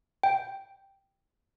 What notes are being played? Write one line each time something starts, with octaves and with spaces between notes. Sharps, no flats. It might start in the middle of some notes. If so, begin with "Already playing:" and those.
G5